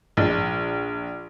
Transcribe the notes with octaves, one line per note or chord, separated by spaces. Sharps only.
A#1